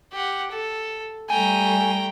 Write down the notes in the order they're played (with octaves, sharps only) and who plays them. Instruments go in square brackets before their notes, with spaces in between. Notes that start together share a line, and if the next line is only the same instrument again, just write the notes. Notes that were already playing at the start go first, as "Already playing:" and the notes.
[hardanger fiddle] G4 F#5
A4
[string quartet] G3 A3 [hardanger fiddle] G5 A#5 [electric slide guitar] G#5